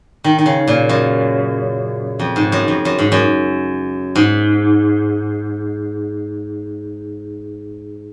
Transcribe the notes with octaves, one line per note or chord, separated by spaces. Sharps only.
D#3
D#3
C#3
A#2
F#2
F2
G#2
F#2
F2
F#2
G#2
F#2
G#2